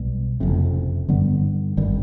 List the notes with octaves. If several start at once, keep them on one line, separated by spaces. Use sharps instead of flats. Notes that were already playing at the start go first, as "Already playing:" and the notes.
Already playing: B1 B2 G3
F#1 F2 C3
G2 D3 G3 B3
G#1 G2 D#3 G3